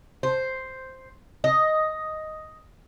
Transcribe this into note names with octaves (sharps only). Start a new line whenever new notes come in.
C5
D#5